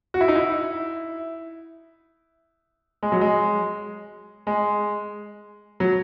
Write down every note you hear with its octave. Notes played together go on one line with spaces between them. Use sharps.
F#4
E4
D#4
E4
G#3
F#3
G#3
G#3
F#3